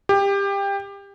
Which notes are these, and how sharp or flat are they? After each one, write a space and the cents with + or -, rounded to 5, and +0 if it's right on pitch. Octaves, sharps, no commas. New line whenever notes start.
G4 +20